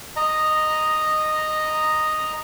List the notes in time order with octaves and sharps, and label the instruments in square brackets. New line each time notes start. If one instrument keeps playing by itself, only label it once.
[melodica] D#5 A#5